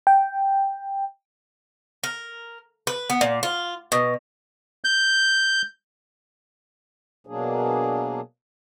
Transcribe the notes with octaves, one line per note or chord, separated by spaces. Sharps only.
G5
A#4
B4
B3
A#2
F4
B2
G6
B2 F#3 A#3 D4 G#4